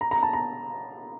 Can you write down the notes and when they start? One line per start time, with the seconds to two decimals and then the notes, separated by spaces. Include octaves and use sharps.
0.01 A#5
0.11 A#5
0.23 A5
0.33 A#5